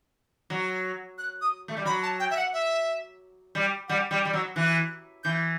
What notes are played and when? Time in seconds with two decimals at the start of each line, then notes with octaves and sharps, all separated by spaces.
0.50 F#3
1.18 F#6
1.41 D#6
1.68 A3
1.77 G3
1.85 F#3 B5
2.03 A5
2.20 G5
2.31 E5
2.37 F#5
2.53 E5
3.55 G3
3.88 G3 F#5
4.11 G3 G5
4.25 G3
4.33 F#3 E6
4.56 E3 F#6
5.24 E3 G6